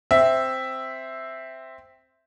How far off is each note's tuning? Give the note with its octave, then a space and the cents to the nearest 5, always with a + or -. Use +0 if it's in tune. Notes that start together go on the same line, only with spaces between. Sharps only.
C4 +0 E5 +0